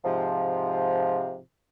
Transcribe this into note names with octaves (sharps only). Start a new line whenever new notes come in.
G#2 C3 F3